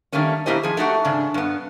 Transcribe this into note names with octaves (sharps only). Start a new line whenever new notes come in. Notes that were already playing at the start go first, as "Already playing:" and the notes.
D#3 E3 G3 A3 A#3 C#4
B2 A#3 E4 G4 C5 D#5
F3 G#4
A3 D#4 F#4 G4 F#5
G#2 C#3 D4
G2 B3